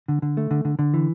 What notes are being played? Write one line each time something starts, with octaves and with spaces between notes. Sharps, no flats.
D3
D3
A3
D3
D3
D3
E3